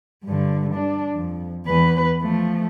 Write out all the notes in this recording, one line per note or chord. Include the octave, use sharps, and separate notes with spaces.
G2 D3
D4
F2
E2 B4
F3 A3